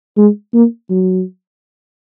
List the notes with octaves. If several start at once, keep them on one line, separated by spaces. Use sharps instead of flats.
G#3
A#3
F#3